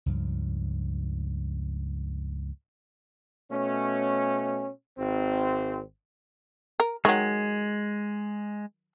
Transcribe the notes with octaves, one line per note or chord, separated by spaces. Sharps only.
C#2 G2 F3
B2 A3 C#4
G#1 C4
A#4
D#3 F#3 G#3